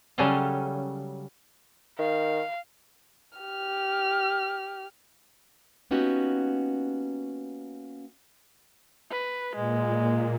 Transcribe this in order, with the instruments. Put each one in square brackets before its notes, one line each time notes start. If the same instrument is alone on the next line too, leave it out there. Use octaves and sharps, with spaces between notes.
[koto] C#3 F#3 G3 C#4 A4 F5
[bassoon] D#3 [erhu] F5
[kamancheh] G4 F6
[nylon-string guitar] A#3 B3 C#4 D#4 F#4 G4
[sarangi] B4
[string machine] A#2 [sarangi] G#3